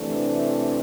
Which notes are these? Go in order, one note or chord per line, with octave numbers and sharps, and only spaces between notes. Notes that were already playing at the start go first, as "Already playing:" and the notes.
Already playing: C3 E3 A3 D4